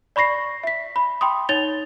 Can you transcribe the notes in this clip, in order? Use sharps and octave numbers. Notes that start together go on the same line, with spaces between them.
D5 B5 C#6 A#6 C7
E5 B6
B5
G5 B5 C6 D#6
D#4 C#5 A6 F7 G7